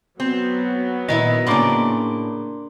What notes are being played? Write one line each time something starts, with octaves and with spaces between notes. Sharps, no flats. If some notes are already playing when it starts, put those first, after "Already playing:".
F#3 B3 C4
A#2 D#3 E4 D#5 E5 A#5
A2 C#3 A#3 D4 B5 C6 D6